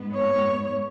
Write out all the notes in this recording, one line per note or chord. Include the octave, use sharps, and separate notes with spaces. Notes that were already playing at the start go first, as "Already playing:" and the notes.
Already playing: G#2 G#3 B3
C#5